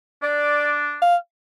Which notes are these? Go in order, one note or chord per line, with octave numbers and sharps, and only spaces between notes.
D4 D5
F5